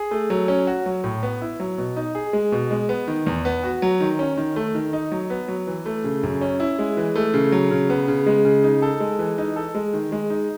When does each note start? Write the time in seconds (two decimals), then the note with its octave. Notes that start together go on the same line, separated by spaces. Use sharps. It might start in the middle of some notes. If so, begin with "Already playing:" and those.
Already playing: G#4
0.11 A3
0.30 F#3
0.48 C#4
0.67 F#4
0.86 F#3
1.04 A2
1.23 B3
1.41 E4
1.60 F#3
1.78 B2
1.97 D#4
2.15 G#4
2.33 G#3
2.52 B2
2.71 G#3
2.89 B3
3.08 D#3
3.27 E2
3.45 B3
3.63 F#4
3.82 F#3
4.01 D#3
4.19 C#4
4.37 D#3
4.56 A3
4.75 D#3
4.93 D#4
5.12 F#3
5.30 B3
5.48 F#3
5.67 E3
5.86 A3
6.04 C#3
6.23 F#2
6.41 C#4
6.60 E4
6.79 G#3
6.97 E3
7.16 A3
7.34 C#3
7.52 F#3
7.71 C#3
7.90 B3
8.08 C#3
8.26 G#3
8.45 C#3
8.63 D#4
8.82 A4
9.00 G#3
9.19 E3
9.38 D#4
9.56 A4
9.75 G#3
9.93 D#3
10.12 G#3
10.30 D#4